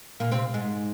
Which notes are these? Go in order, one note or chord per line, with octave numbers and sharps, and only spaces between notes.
A#2 A#3
C3 C4
G#2 G#3